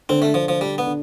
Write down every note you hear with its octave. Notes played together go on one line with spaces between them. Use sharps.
D3 C4
A3
D3 F3
F3
G3 D4
B3
D3